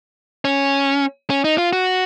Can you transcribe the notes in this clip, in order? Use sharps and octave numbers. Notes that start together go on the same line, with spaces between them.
C#4
C#4
D#4
F4
F#4